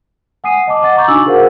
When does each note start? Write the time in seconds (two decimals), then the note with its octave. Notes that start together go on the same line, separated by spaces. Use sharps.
0.44 F#5 G#5 D#6 C7 D#7
0.67 D#5 A5 D6
0.82 D#5 F#5 A6
0.96 A#5 C#6 D6 G6 A6
1.08 D4 D#4 F#4 G#5 E6 F#7
1.25 F#4 G#4 A#4 C5 F5 F#5